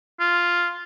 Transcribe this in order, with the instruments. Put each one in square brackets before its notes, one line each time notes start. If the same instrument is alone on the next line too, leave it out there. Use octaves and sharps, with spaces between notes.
[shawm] F4